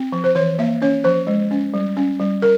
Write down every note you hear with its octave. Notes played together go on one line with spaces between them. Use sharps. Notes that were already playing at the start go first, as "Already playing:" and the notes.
Already playing: C4
F3
C5
E3 C#5
A#3 E5
C#4 C#5
F3 C5
G#3
C#4
G3
C#4
G3
A#4